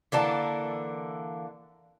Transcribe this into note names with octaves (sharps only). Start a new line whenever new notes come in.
D3 E3 A#3 A5